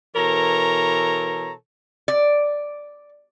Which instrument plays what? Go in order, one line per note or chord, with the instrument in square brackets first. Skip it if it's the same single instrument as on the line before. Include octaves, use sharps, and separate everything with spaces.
[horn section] B2 E3 A4 A#4 C#5 A#5
[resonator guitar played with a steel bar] D5